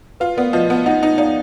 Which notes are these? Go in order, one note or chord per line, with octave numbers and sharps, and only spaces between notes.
F4 B4
B3 A#4 D5
F3 B4 D#5
B3
D#4 D#5 F#5
D#4
D#4 D5 F5